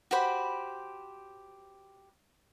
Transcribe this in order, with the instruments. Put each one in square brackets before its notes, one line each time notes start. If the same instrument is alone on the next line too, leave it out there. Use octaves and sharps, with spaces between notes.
[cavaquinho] F#4 G4 C5 B5